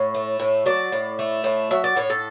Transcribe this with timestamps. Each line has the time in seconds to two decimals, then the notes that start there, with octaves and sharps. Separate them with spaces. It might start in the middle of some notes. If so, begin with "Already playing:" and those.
Already playing: A2 C#5
0.15 A3
0.40 A2
0.66 F#3 D5
0.92 A2
1.19 A3
1.44 A2
1.71 F#3 E5
1.84 D5
1.96 A2 C#5
2.10 A4